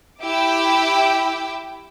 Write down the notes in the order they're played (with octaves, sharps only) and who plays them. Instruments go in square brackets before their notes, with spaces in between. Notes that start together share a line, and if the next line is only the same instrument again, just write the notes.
[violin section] E4 G4 G5 D6 E6